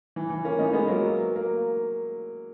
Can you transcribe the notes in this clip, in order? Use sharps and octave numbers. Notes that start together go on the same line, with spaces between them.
E3
E3
A#3 C#4
B3 D#4
G#3 B3
F#3 A#3
A#3